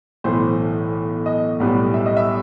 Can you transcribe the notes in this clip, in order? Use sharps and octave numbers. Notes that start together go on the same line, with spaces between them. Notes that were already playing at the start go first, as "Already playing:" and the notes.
B1 A2 E3 A3 C5
D#5
B1 A2 G3 B3
E5
D#5
E5